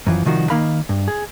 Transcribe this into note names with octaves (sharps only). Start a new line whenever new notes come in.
F#2 E3 F3
C2 D#3 F3 F#4
D#3 A#3 D#4 F5 B5
G2
G#4